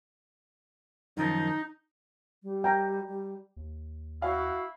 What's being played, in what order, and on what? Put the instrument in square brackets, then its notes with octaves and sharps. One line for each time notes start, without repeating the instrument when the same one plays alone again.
[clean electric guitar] F#2 D#3 F3 [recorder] D#4
[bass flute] G3
[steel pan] G5 A#5
[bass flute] G3
[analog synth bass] D#2
[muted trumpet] E4 [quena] F#4 [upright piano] F5